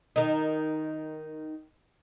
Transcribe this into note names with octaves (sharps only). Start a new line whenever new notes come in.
D#3 D#4